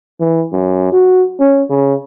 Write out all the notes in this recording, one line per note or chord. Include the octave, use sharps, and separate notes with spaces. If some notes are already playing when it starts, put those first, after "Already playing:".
E3
F#2
F#4
C#4
C#3